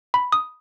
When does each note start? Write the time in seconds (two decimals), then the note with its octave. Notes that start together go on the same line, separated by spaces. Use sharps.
0.14 B5
0.32 D#6